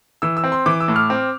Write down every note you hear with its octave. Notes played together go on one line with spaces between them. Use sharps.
E3 E6
E6
C4
C6
E3 D6
E6
A2
F6
C4